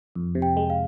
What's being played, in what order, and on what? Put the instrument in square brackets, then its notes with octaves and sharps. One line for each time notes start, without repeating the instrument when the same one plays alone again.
[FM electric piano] F2
C3
[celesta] G5
[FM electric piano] G#3
[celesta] F5